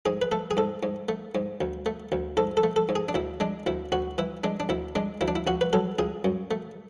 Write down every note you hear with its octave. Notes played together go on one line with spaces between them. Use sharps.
G#2 G#4
B4
A3 A4
G#4
G#2 A4
G#2
A3
G#2
D2
A3
D2
G#2 A4
A4
A3
A4
G#2
G#4
D4
D2 E4
G#3 D4
D2 E4
D2 F#4
E3 E4
G#3 D4
D4
D2 E4
G#3 D4
D2 E4
D4
E4
C#2 F#4
B4
F#3 A4
C#2 G#4
F#2
A3